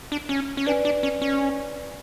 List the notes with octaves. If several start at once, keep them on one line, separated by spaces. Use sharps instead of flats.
D4
C#4
C#4
D4 B4 D5 G#5
D4
C#4
C#4